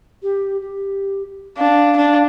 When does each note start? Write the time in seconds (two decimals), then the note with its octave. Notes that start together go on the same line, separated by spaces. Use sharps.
0.23 G4
0.61 G4
1.58 D4 F5
1.96 D4